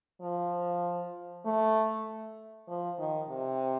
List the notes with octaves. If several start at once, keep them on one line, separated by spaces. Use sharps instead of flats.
F3
A3
F3
D#3
C3